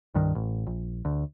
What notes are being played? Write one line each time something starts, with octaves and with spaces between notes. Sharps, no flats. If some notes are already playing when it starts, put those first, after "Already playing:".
C2 G2 D#3
A1
A#1
D2